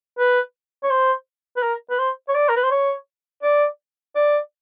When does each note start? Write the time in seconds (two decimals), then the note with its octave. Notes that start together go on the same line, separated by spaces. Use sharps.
0.18 B4
0.83 C#5
0.90 C5
1.56 B4
1.63 A#4
1.90 B4
1.98 C5
2.29 C#5
2.35 D5
2.49 A#4
2.56 B4
2.63 C5
2.71 C#5
3.43 D5
4.15 D5